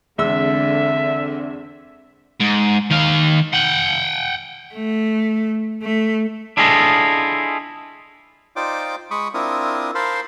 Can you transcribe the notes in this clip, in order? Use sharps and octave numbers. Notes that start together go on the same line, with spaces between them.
E2 D3 G#3 C4 E5 E6
G#2
D#3 F5
F#5 G5
A3
A3
D4 E4 F4 G#4 A4 D#5
D#4 F4 C5 D5 G5 D6
G#3 B5 C#6 D#6
C4 D4 E4 F4 A#4 D#6
A#4 C5 F5 A5 B5 C6